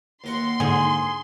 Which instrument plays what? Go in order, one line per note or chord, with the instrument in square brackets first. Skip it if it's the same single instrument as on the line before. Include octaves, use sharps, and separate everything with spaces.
[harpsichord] D#2 A#4 F#5 [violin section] C6
[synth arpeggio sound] G#2 D3 [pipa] G#4